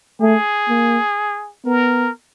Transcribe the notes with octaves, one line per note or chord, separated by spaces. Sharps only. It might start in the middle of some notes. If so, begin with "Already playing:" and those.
A3 G#4
A#3
B3 A#4